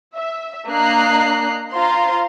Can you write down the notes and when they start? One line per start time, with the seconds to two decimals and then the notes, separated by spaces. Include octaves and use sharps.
0.15 E5
0.67 A#3 D4 D#5 A#5 F#6 C7
1.73 F4 C5 F5 A#5 C6